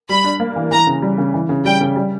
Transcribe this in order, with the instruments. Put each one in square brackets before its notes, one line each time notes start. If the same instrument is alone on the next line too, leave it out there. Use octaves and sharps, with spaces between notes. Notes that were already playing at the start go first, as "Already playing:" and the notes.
[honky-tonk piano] G3 [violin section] B5
[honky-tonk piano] D4
A#3
E3
[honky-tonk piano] E3 [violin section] A#5
[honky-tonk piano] C#3
G3
C#3
E3
C#3
[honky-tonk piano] G3 [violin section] G5
[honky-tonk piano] C#3
G3